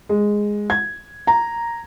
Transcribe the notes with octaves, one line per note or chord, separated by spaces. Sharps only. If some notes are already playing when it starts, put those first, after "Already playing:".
G#3
G#6
A#5